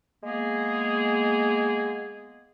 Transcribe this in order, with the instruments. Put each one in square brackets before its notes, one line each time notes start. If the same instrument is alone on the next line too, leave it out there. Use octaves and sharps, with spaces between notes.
[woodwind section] G#3 A#3 B3 G#4